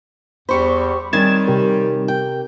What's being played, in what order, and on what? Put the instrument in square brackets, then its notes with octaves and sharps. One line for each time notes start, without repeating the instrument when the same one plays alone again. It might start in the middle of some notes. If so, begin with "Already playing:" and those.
[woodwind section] E2 [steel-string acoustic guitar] G3 G4 C5 [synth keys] B5 C#6
[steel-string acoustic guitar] D#3 C#4 [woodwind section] G3 C4 [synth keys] G#6 A6 E7
[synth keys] C3 G4 A#4
[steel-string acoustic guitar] G5